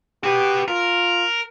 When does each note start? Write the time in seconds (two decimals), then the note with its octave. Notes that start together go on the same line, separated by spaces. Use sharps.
0.24 F#4 G4 B4
0.68 F4 A#4